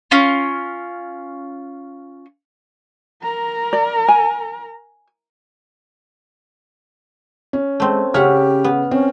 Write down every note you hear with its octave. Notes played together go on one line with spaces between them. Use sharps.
C#4 F4
A#4 A#5
D5
G#5
C#4
G#3 A3 C4
C#3 C#4 G4 E5 F#5 F6
B3
C4 C#4